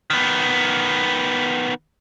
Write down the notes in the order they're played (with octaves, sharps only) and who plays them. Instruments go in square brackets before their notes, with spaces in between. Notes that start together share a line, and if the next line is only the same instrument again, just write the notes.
[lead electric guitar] D#3 B3